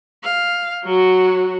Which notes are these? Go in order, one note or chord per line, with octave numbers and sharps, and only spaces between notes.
F5
F#3 F#4